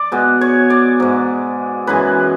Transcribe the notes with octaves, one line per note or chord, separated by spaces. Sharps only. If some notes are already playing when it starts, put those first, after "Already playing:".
Already playing: D5
B2 G#3
C#5
D5
G#2 G#3
F#2 E3 G#3 B4